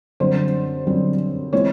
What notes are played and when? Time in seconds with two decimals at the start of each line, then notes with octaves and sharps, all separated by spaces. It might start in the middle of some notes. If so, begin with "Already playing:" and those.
0.20 F#2 D3 G3 C4 C5
0.87 F#2 D3 G3 C4
1.53 E3 G#3 C4 C#5